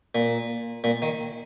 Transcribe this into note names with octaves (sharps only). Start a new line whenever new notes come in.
A#2
A#2
D#3